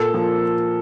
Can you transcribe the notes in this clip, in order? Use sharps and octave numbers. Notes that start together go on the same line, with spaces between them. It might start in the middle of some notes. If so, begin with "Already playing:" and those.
Already playing: A#2 A4
F3 A#3